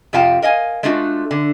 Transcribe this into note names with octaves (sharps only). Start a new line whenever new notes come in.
F2 C3 F4 F5 G5 A5
A#4 D#5 F5 G#5
G#3 A3 D4 F4 F#4
D3